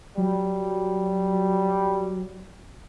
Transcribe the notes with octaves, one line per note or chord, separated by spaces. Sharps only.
F#3 G3